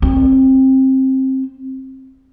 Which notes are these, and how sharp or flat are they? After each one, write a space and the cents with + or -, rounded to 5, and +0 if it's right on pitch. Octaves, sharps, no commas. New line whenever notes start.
C4 +20